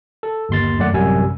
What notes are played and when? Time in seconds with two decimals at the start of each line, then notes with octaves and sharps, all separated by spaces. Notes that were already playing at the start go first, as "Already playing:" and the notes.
0.23 A4
0.49 G1 D#2 C6 A6
0.79 F#2 A3 D5 F#5
0.94 A1 F#2 C3 G3 G#5 E6